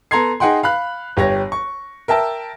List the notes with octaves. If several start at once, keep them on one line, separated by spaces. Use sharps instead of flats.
B3 A4 A#5 C6 G#6 C7
D#4 G#4 F#5 G5 C6
F5 B5 F#6
G1 G4 C#5 A#6
C#6
A#4 E5 G5 A5 E6